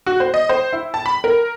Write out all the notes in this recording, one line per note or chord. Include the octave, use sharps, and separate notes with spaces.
F#4
C5
D#5
C5
E4
A5
B5
A#4